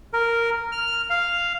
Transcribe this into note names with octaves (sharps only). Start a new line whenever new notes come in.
A#4
F6
F5